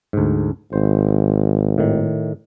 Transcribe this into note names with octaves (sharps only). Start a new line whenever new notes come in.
D2 G#2
G#1 C5
A2 D#3